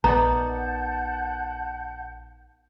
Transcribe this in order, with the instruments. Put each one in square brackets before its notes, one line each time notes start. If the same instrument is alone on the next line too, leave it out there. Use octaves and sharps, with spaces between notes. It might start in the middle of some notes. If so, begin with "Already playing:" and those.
[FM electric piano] A#1 [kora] B3 D#4 D5 [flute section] F#5 A5 G6 [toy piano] A#5